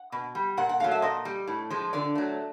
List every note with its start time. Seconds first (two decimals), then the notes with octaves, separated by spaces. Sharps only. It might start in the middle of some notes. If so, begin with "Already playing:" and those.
Already playing: F#5
0.12 B2
0.35 G3
0.57 A#2 F#5
0.69 F#5
0.80 F#3 A3 F5
0.91 E5
1.02 A#2 D#5
1.25 G3
1.47 A2
1.70 F3 G#3
1.93 D3 D5
2.15 F#3 A3